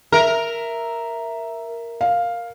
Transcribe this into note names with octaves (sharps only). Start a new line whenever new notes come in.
A#4 E5
F5